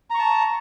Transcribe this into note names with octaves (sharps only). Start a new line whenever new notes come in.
A5 A#5 C#6